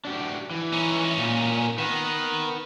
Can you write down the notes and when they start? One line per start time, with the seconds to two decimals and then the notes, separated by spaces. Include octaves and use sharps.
0.05 D4 F#4 G4
0.51 E3
0.72 C#4 D#4
1.18 A#2
1.78 D#3 B4 F#5